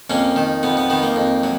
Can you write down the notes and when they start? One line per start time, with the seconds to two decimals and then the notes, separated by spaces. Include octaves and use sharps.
0.10 F2 A#3 C#4
0.36 D#3
0.63 F2 B3
0.77 B3
0.90 D#3 B3
1.03 A#3
1.16 F2
1.43 F#3